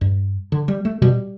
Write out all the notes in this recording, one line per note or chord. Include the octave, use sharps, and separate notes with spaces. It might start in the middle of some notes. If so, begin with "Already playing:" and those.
G2
D3
G3
A3
B2 G3